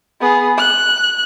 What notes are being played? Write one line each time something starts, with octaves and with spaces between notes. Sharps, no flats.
B3 G#4
F#6